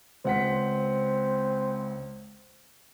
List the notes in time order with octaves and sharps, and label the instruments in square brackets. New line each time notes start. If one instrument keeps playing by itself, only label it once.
[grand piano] C#2 F#5 B6 [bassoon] C4